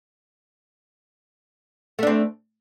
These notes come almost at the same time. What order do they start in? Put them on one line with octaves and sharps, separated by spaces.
A3 D4 C4